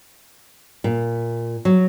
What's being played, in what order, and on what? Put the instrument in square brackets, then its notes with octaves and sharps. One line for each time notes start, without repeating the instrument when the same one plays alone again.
[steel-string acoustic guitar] A#2
F#3